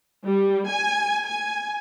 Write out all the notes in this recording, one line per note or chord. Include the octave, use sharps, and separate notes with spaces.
G3
G#5
G#5